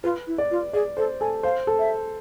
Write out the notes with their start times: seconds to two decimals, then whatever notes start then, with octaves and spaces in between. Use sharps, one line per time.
0.04 F4 B4
0.27 E4
0.38 D5
0.51 F4
0.73 G#4 D5
0.97 A4 C5
1.21 A4 G#5
1.43 C5 F5
1.67 A4
1.79 E5